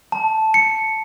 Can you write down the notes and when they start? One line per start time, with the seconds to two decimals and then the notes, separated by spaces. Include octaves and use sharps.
0.12 A5
0.54 C#7